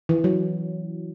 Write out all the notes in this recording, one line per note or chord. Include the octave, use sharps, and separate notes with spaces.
E3
F#3